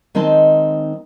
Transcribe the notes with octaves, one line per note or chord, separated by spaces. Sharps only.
D#3 G#3 C4 D#4 A5